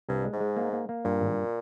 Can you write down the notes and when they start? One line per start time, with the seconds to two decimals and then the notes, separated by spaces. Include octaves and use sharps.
0.08 C2 G2
0.25 G#3
0.33 G#2
0.40 G#3
0.57 A#3
0.73 A#3
0.89 A#3
1.05 G2 A#2
1.21 G#1